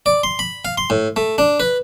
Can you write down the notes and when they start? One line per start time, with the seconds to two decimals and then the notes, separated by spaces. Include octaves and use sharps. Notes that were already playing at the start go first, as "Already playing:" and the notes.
0.06 D5
0.23 C6
0.39 B5
0.65 F5
0.78 C6
0.90 A2
1.16 A3
1.38 D4
1.60 B4